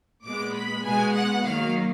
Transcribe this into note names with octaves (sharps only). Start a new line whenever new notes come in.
A#2 G#3 B3 D6
B5
B2 G#3 B3 G#5
F#5
D#3 F#3 A#3 F5